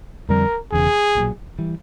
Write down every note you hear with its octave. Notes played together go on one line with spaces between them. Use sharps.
F2 D3 G3 C4 A#4
E1 E2 C#3 G#4
B1 A#2 F#3
E3 G3